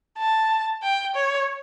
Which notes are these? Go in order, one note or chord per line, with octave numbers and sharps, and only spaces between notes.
A5
G5
C#5